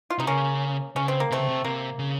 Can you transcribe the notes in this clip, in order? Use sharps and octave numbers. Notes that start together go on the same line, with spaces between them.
F4
C3 D#4
C#3 A#3 C#4
C#3 C#4
C4
A#3
C3 A3 C4
C#3
C3
C3 A#3
C#3